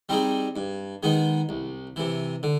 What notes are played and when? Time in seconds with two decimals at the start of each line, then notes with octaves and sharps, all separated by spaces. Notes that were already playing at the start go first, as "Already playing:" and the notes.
0.09 G3 C4 D#4 G#4
0.56 G2
1.03 D#3 G#3 B3 D#4
1.49 C2
1.96 C3 E3
2.43 D3